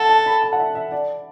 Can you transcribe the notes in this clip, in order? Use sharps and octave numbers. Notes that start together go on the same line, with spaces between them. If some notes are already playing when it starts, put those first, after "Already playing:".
Already playing: A4 E5 F#5
A5
B5
A5
F#5
E5
E5
D5